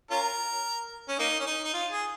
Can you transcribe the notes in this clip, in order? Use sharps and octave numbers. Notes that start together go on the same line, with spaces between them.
C#4 F4 A#4
C#4
A#3 D#4
C#4
D#4
D#4
F4
G#4